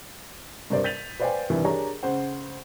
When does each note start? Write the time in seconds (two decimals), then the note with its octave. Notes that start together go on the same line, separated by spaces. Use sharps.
0.70 G2 C3 A#4 C5 D5
0.84 G6 A6 B6 D#7 F7 F#7
1.20 B4 C5 D5 F5 G5 G#5
1.50 G2 C3 D#3 E3 G3
1.64 D4 G4 G#4 A#4 C#5 A#5
2.03 C#3 C5 F#5